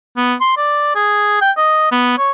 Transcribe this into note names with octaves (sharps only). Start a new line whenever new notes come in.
B3
C6
D5
G#4
G5
D#5
B3
C#5